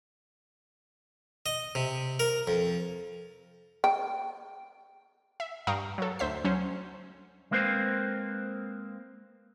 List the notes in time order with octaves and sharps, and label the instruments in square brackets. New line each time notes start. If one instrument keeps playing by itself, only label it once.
[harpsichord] D#5
C3
A#4
F2
[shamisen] G5
[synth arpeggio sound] E5
G2 F5 G5 A#5 C#6 D#6
F#3 A4
D2 C5 E5 B6
F#3 C#4 C5
[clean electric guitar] G#3 A#3 C4 B4 C5